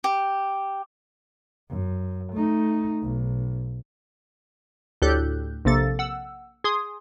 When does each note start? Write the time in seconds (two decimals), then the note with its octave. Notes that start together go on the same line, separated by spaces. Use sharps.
0.04 G4
1.70 F#2
2.33 A3 D#4
3.01 B1
5.02 D2 A2 G4 A4 F#6 G6
5.65 A#1 C3 A#3 A4 A6
5.99 F#5 E6
6.64 G#4 C6 D#6